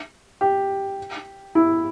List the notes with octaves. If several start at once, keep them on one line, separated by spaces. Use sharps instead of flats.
G4
E4